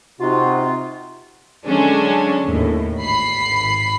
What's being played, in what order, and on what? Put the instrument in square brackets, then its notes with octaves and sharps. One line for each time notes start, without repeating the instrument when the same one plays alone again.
[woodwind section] C3 F4 [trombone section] C4 D#4 F#4
[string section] D3 F#3 G#3 C#4 D4
D#2 A2
G#1 B5 C7